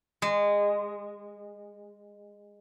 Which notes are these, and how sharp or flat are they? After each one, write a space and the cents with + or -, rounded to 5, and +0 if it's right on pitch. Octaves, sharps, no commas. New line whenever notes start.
G#3 -20